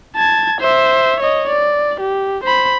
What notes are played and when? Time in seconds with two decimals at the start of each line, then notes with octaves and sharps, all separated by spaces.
0.16 A5 G#6
0.60 C5 E5
1.20 C#5 D#5
1.50 D5
2.00 G4
2.44 C5 B5